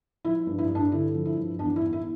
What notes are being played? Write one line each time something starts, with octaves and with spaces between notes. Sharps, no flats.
F3 E4
G2
E4
G2
D4
D3 E4
F3
E4
G2
E2 D4
E4
E2
E4